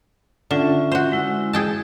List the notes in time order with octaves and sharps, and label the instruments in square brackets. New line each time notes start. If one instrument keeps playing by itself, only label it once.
[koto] D3 [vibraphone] C#4 F4 E5
[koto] F#4 C5
[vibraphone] G#3 E4
[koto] G#4 G5 A5